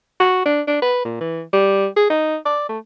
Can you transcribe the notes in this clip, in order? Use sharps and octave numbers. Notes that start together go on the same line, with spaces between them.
F#4
D4
D4
B4
A#2
E3
G3
G#4
D#4
D5
A3